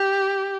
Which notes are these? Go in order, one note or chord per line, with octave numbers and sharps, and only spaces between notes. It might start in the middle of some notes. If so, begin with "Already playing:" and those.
Already playing: G4